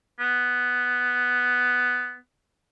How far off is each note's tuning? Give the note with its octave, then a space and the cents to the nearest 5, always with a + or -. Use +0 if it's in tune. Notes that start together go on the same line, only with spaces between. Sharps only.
B3 +5